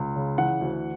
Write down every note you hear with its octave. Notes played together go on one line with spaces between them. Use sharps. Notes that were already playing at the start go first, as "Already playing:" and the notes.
Already playing: C#2
C#3
E3 F#5
D2